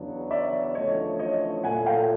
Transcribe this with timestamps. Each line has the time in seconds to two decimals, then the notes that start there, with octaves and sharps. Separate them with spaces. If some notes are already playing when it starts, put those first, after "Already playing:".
Already playing: E2 C#3 F#3 B3 D4
0.31 D5 E5
0.75 E2 C#3 F3 A3 D4 C#5 D#5
1.19 C#5 D#5
1.64 A#2 F#3 A3 F#5 G#5
1.86 F5 G5